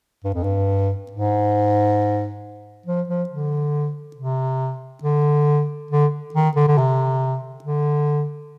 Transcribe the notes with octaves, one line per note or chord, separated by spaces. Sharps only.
G2
F2
G2
G#2
F3
F3
D3
C3
D3
D3
D#3
D3
D3
C3
D3